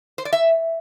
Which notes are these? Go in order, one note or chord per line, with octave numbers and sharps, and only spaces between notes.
C5
D5
E5